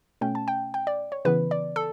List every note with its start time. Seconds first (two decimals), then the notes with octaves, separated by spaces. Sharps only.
0.21 B2 A3 C#4 G5
0.35 A5
0.48 G5
0.74 G5
0.87 D5
1.12 C#5
1.25 C#3 E3 B3 B4
1.51 D5
1.76 A4